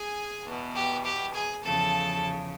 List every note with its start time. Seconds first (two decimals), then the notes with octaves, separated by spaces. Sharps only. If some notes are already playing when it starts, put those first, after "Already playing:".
Already playing: G#4 G#5
0.45 E2 B2
0.75 G4 G5
1.04 G4 G5
1.33 G#4 G#5
1.63 E2 C#3 F3 A4 A5